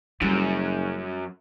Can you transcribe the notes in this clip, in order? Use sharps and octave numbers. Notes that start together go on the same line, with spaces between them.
F#1 F#2 G3